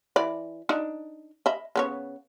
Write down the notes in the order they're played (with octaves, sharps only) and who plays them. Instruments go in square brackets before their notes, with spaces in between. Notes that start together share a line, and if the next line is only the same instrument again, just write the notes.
[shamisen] E3 D5 B5
D4 D#4
D#5 E5 B5
C#3 B3 C#5